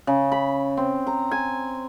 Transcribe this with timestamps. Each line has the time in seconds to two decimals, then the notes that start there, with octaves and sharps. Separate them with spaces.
0.07 C#3
0.32 B5
0.77 C4
1.07 A#5
1.31 G#5